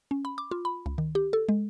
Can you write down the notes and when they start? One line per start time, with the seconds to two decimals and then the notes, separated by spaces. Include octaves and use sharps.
0.11 C#4
0.25 B5
0.38 D6
0.51 F4
0.65 B5
0.86 C#2
0.98 D#3
1.15 G4
1.33 A4
1.49 G#3